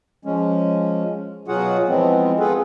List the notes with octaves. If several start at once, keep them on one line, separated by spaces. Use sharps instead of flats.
F3 G#3 C#4
B2 F#3 F4 F#4 G#4 F#5
E3 F3 G#3 B3 C4
C4 F4 G#4 A4 B4